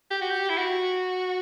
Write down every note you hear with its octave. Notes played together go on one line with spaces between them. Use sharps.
G4
F#4
G4
E4
F#4